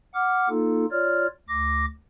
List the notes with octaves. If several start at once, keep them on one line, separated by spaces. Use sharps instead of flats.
F#5 D6 F6
A#3 D#4 F4 A4
F4 C#5 D5 F6
D2 D6 A#6